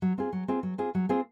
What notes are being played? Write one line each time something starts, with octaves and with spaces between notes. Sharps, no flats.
F#3
C4 F4 G#4
F#3
C4 F4 G#4
F#3
C4 F4 G#4
F#3
C4 F4 G#4